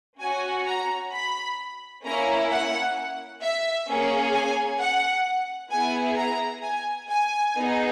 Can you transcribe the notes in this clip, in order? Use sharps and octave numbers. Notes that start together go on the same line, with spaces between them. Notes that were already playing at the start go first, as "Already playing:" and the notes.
C#4 F#4 G#5
A#5
B5
A#3 C#4 E4 A#5
F#5
E5
A#3 C#4 G#4
G#5
F#5
B3 E4 G#4 G#5
A#5
G#5
G#5
B3 D#4 G#4